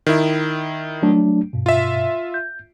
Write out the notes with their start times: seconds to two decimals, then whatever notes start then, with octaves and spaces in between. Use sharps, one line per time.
0.06 D#3 E4
1.03 F#3 A3 D4
1.53 G2 B2
1.66 F4 E5
2.34 G6